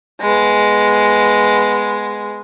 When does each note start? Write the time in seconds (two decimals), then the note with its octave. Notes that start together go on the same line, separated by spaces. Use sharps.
0.20 G#3 B3